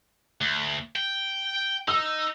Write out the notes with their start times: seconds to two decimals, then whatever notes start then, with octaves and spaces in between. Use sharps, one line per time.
0.41 D2
0.96 G5
1.88 D#4 E6